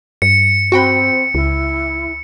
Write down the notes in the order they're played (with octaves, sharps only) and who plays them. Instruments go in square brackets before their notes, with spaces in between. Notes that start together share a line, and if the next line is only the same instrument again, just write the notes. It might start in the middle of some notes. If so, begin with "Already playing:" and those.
[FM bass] G2 [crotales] C#7
[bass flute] C4 [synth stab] F#4 G5 B5
[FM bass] C#2 [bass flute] E4